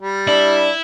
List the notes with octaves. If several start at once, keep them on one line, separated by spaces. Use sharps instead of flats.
G3
D4 E4